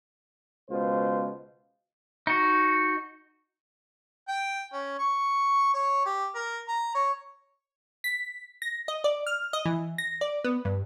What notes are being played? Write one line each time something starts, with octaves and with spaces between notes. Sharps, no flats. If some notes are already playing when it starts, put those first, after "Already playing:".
C#2 B2 G#3 F4 C5
D#4 F#4
G5
C#4
C#6
C#5
G4
A#4
A#5
C#5
B6
A#6
D#5
D5
F6
D#5
E3
A#6
D5
B3
G2